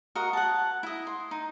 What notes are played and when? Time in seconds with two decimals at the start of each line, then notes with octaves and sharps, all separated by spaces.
0.15 F#4 A#4 D#5 F#5
0.33 F#5 A5
0.83 E4 D#5
1.07 C6
1.31 D#4